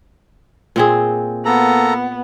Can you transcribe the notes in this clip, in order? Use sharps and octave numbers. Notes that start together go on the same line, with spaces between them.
A#2 C4 G#4
A#3 B3 A4 A#5